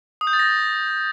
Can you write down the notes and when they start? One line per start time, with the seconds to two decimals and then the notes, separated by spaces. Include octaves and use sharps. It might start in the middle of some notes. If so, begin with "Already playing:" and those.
0.21 D#6
0.27 G6
0.33 A6
0.39 A#6